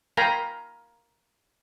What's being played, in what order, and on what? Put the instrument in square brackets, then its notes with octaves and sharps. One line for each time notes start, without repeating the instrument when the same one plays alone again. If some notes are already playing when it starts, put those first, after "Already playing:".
[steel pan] A#4 F5 G5 G#5 A#5 B5